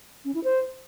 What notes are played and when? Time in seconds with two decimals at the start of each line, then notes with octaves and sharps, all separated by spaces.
0.25 C#4
0.34 E4
0.44 C5